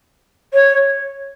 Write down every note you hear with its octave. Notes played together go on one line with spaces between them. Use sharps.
C#5